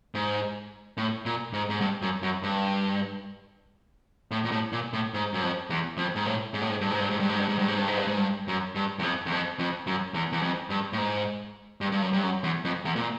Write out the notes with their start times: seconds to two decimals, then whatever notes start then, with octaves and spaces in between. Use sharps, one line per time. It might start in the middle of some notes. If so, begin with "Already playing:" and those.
0.15 G#2
0.97 A2
1.26 A#2
1.53 G#2
1.70 G#2
1.81 G2
2.02 F#2
2.22 F#2
2.43 G2
4.31 A2
4.45 A#2
4.52 A2
4.73 A#2
4.93 A2
5.14 G#2
5.34 F#2
5.42 F2
5.70 E2
5.97 F2
6.15 G#2
6.26 A2
6.54 G#2
6.61 A2
6.70 G#2
6.81 G2
6.91 G#2
7.00 G2
7.10 G#2
7.20 G2
7.29 G#2
7.39 G2
7.49 G#2
7.59 G2
7.68 G#2
7.78 G2
7.88 G#2
7.97 G2
8.07 G#2
8.17 G2
8.48 F#2
8.75 G2
8.99 E2
9.03 F2
9.26 E2
9.32 F2
9.59 F2
9.87 F#2
10.14 E2
10.32 E2
10.42 F2
10.70 G2
10.93 A2
10.98 G#2
11.81 G2
11.92 G2
12.02 F#2
12.13 G2
12.23 F#2
12.44 E2
12.65 F2
12.85 E2
12.96 A#2